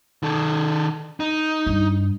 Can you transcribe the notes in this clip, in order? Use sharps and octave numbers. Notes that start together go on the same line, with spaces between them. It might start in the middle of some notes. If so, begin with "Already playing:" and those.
D#3 A4
D#4
G2